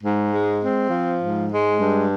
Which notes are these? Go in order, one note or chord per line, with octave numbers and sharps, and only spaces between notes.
G#2
G#3
C4
F3
G#2
G#3
G2